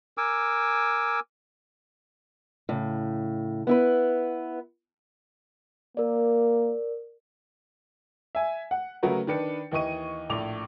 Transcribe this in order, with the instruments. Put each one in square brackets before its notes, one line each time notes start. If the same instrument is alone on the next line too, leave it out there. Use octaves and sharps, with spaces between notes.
[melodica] A#4 G#5 D6 E6
[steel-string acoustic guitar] A2 C#3
B3 E4 B4
[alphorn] A#3 [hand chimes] A#4 D5
[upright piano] E5 G#5
F#5
C#3 F#3 A3 F#4 A#4 B4
D#3 D4 B4 C#7
D#2 E3 D#5 C#6 D#7
A#1 A2 D6 F7